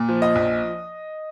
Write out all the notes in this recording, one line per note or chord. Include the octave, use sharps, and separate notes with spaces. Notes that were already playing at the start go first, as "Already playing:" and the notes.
Already playing: A#2
F3
D#5
A#1